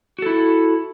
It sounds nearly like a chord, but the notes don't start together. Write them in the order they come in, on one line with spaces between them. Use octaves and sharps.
F#4 A4 E4